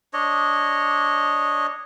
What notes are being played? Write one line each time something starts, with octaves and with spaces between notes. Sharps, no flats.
D4 C#5 D#5